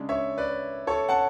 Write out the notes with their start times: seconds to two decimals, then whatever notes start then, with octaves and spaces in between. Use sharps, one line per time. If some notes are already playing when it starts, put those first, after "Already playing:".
Already playing: C#3 G#3 D4
0.09 C#5 E5
0.38 B4 D5
0.87 A4 C#5
1.09 F#5 A5